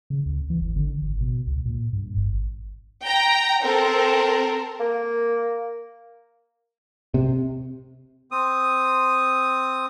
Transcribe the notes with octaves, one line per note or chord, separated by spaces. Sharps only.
C#3
D2
E3
G#1
D3
G#1
B2
C#2
A#2
G2
G#1
G5 A#5
C4 A4 A#4
A#3
C3
C4 D#6